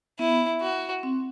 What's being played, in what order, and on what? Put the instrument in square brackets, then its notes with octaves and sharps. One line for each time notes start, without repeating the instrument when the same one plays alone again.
[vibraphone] B3 [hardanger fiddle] E4
[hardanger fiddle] F#4
[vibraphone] C4